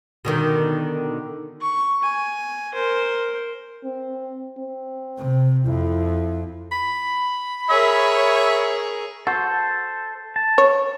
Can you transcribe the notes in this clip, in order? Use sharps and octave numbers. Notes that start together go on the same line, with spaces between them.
B2 D3 D#3
C#6
G#5
A#4 C5
C4
C4
C3
F2 E4
B5
G#4 A#4 C#5 E5
F#4 A4 C5
A5
C#5